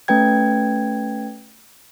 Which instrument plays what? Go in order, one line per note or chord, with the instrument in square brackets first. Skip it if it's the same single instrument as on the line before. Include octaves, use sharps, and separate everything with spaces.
[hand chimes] A3 C#4 B4 G5 G#6